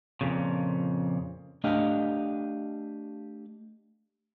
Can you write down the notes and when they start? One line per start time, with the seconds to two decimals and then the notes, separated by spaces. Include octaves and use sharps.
0.21 F2 A#2 C#3
1.64 A3 D4 G4 D#5 F5